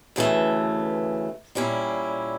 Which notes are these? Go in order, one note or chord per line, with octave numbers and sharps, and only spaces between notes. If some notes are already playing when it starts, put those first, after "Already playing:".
D2 C#3 E3 A3
A#2 G3 C#4 E4